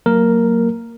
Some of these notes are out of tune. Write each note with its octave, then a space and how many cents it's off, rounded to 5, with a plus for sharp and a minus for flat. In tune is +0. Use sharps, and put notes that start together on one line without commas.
F#3 +0 A#3 -20 A#4 +0